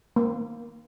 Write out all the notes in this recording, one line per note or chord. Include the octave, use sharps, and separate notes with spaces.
A#3